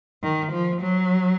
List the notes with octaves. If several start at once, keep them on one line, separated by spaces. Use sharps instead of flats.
D#3
F3
F#3